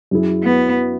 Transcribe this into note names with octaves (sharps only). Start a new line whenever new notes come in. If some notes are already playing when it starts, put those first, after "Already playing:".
F#2 F#3 E4 G#4
B3